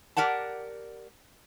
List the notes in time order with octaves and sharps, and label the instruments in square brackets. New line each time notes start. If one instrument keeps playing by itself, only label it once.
[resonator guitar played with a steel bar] G4 A#4 D5 F#5 A5